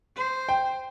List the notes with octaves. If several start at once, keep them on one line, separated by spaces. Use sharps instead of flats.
C5
G5